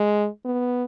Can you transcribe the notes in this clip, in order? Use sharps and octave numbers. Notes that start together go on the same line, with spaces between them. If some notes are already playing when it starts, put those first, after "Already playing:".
Already playing: G#3
B3